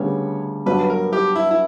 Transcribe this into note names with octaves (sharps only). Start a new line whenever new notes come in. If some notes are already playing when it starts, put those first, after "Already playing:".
Already playing: D2 C#3 G3 B3 C#5
G2 F#3 B3 B4
A#4
G4
E4
E4